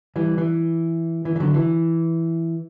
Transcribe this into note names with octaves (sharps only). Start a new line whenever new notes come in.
E3 G3
E3
E3
E3
D3 F#3
E3